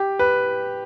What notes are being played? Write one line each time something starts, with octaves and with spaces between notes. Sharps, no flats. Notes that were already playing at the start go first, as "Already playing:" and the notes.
Already playing: G4
B4